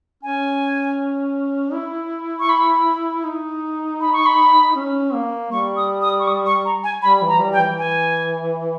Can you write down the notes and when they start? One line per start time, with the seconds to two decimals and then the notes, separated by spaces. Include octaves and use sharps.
0.23 C#4 G#5
1.73 E4
2.40 C#6
2.49 B5
3.25 D#4
4.01 B5
4.13 C#6
4.26 B5
4.75 C#4
5.14 A#3
5.51 G3 C#6
5.77 D#6
6.02 D#6
6.19 C#6
6.28 D#6
6.46 C#6
6.65 A#5
6.84 G#5
7.02 G3 B5
7.22 E3
7.28 A#5
7.40 G3
7.53 G5
7.59 E3
7.78 G#5